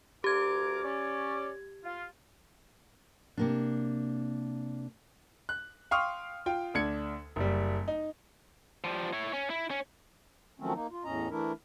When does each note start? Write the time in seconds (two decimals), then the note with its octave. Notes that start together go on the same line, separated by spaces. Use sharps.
0.24 D2 G4 A#4 D6 G#6
0.84 C#4 D5
1.84 F4
3.37 C3 A#3 D4
5.49 F#6
5.91 F5 G5 C6 C#6 D#6 F6
6.46 F4 G5
6.74 D2 D4 G#6 C#7
7.36 F#1 G3
7.88 D#4
8.84 F3 G3
9.13 E4 C#5
9.33 C#4
9.50 E4
9.70 C#4
10.60 D#3 F3 F#3 A3 C4 C#4
10.74 A#3 D#4
10.91 F4
11.05 E2 A2 C#4 D#5 A#5
11.30 E3 A3 D4 E4 A#4